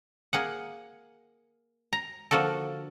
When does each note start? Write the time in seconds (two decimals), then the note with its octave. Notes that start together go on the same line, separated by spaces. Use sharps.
0.33 A#3 G#4 F#5
1.93 A#5
2.31 D3 F3 A#3 F#4 A4